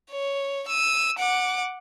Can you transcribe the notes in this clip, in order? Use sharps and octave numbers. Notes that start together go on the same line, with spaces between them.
C#5
E6 D#7
F#5 D6